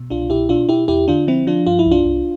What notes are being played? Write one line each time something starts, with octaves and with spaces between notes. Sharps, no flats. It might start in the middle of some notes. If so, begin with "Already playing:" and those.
Already playing: B2
C2 D4 F4
B2 E4 G4
B2 D4 F4
B2 E4 G4
E2 E4 G4
D3 D4 F4
F3 C4 E4
F3 D4 F4
G2 F4
E4
C2
D4 F4
C2